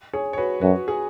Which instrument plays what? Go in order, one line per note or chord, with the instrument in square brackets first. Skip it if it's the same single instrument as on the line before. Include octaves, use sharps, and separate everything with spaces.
[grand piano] G#4 C#5
C#5
F#4 B4
[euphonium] F#2 [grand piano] F#4 B4
[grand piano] G#4